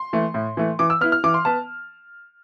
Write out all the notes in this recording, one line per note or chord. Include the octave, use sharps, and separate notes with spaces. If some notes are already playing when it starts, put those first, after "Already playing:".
Already playing: C6
E3 A3
A2
E3 A3
E3 D6
E6
B3 E4 F6
F6
E3 D6
C6
B3 A5